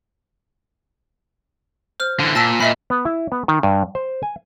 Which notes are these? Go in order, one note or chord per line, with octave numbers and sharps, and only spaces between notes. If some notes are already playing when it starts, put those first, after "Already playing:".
C5 F6
D3 E3
A#2 A5 E6 B6
A#2 D#5 E5 B5
B3
E4
B3
D#3
G2
C5
G#5